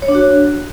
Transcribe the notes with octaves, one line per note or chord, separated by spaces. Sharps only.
C#5
D4
F#4